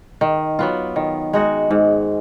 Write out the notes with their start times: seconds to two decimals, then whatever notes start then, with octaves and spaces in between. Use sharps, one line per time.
0.21 D#3
0.59 F#3 B3 F4
0.96 D#3
1.33 G#3 D#4 F#4
1.71 G#2